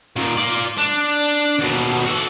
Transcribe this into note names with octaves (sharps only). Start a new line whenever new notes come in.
A#2 D#3
F4 D5
D4
D#2 B2
F#4 A4